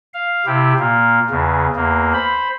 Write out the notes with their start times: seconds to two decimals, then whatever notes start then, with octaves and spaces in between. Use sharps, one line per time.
0.14 F5
0.46 C3 E4 G4
0.79 A#2 A#3
1.30 E2 C#3
1.75 E2 A#3
2.14 C5 B5